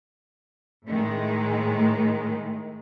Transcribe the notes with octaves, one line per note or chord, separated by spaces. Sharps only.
A2 D#3 G#3